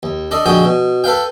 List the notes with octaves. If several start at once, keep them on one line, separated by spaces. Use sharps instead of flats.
D#2
D4 A4 D#5
A#1 D3 G#3 F#4 G5 D#6
B2
A4 B4 F5 G5